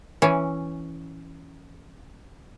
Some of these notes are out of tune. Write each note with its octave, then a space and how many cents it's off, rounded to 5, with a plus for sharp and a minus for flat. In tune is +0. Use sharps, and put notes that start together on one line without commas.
E3 +0 C#4 +0